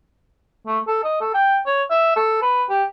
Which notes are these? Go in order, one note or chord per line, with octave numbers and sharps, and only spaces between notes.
A3
A4
D#5
A4
G5
C#5
E5
A4
B4
G4